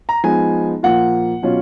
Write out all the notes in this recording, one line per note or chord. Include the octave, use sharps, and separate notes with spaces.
A#5
F3 G#3 B3 D#4 G#5
A#2 F3 A#3 F4 F#5
B2 F#3 C#4 F4